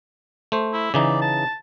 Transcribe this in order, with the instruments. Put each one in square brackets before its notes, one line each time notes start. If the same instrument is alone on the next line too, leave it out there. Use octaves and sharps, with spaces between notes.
[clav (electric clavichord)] A3 C5
[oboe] E4
[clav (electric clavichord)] C#3 E3 D#4 [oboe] D5
[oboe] A5